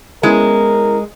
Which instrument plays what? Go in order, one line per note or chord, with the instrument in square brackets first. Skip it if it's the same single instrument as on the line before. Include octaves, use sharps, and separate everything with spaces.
[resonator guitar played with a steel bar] G#3 [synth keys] B3 C#4 E4 [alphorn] A#4